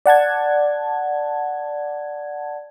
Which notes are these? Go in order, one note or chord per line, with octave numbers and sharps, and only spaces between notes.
D5 F#5 A5 G#6